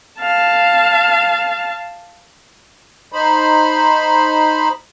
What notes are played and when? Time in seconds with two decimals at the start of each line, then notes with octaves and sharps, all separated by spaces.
0.20 F5 A5
3.12 D#4 C5 B5